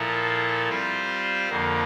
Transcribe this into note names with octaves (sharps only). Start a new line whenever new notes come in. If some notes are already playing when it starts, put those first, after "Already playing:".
Already playing: A#2 F3 A#3 E4 A4
G3 C4 F4 C5
F2 D3 F3 A#3